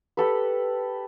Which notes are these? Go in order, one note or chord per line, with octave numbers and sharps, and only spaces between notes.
G4 A4 B4